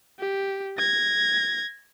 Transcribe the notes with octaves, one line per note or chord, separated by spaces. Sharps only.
G4
G#6 A#6